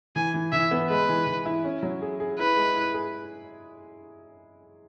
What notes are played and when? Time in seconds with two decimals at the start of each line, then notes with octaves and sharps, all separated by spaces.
0.16 E3 G#5
0.34 E3
0.52 E3 E5
0.71 B3
0.90 G#3 B4
1.09 E3
1.27 E3
1.46 E4
1.65 C#4
1.83 F#3
2.02 G#4
2.20 G#4
2.39 E4 B4
2.57 G#3
2.76 E4
2.94 G#4